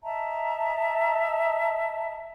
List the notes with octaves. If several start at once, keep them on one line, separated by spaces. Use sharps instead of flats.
D#5 E5 A5 A#5